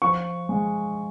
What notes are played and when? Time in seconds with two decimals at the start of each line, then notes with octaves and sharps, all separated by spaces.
0.02 F3 C#6
0.49 G#3